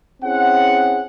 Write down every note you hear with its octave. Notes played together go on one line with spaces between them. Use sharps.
C4 C#4 E4 G#4 F#5